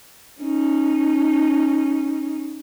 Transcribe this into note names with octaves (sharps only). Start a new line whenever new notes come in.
C#4 D#4